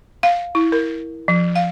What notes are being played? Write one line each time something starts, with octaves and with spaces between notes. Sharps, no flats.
F5
E4
A#4
F3
F5